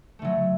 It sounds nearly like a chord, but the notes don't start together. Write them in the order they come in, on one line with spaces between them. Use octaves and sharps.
A3 D3 F#3